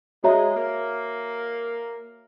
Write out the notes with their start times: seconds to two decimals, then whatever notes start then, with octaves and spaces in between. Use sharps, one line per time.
0.24 G#3 F#4 C#5 E5 A#5
0.55 A#3